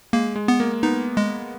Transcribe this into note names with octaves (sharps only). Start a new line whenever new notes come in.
G#3 A#3
G#3
B3
A#3
B3 D#4
G#3